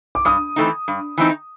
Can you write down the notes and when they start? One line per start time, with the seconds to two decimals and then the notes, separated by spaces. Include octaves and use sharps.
0.15 D6
0.25 G2 D#6
0.56 E3 A3 C4 D#4
0.88 G2
1.18 E3 A3 C4 D#4